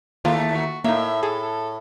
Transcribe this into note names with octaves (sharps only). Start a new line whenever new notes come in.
D#2 A3 A#3 F4 A5
F#4
A2 A#3 D#4 E5
G#4 A4
A4